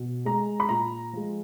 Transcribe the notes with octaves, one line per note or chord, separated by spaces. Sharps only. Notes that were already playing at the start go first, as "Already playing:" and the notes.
Already playing: B2
G#3 A#5
B5
A#2 A#5
F3 G#3